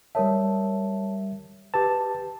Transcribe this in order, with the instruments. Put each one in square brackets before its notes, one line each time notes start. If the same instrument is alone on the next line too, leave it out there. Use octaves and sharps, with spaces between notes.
[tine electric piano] G3 E5 [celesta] A#4 C#5 A5
[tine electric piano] G4 A5 [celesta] B4